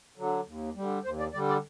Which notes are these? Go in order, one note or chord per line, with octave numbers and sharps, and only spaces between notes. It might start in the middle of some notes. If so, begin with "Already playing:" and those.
D3 F#3
D#2
D3 G3
D#2 C5
D5
D3 G3 D5
D5